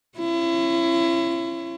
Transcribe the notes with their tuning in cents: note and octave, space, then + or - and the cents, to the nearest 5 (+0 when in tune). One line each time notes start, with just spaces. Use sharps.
C#4 -30 E4 +35